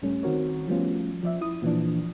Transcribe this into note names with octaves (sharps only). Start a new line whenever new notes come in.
C#2 A2 G3 A3 C#4
D#3 C4 F#4 A#4 C#5
F3 G3 A3 B3 C#4 F4
F3 D5 E5
E4 D#6
A#2 E3 F3 D4